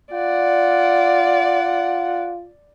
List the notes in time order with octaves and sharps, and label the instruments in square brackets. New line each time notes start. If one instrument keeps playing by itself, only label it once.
[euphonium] F4 [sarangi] D5 [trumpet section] F#5